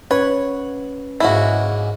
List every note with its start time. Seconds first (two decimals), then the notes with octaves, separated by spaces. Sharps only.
0.11 C#4 B4 C#5 F#5
1.20 G#2 C#3 A#3 E4 F#4